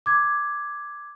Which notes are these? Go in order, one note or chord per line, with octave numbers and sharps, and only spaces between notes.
D6 G#6